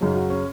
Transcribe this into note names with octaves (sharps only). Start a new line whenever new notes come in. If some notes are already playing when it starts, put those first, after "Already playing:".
F#2 C#3 F#3 D#4
F#4
C#4